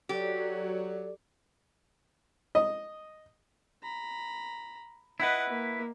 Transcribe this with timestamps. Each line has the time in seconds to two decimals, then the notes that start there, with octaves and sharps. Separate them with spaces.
0.09 F#3 G4 A4 D5
2.55 D#5
3.83 A#5 B5
5.20 E4 B4 D#5 F#5
5.49 A#3